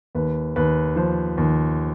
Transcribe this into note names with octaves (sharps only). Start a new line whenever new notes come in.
D#2 B4
D#2 B4
F3 C5
D#2